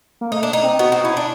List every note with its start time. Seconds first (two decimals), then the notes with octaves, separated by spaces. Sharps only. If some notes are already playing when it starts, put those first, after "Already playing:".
0.21 A#3
0.31 A3 D#4
0.43 D4
0.53 D#4
0.63 C4
0.79 B3 F#4
0.92 C4
1.04 C#4 E4
1.17 D4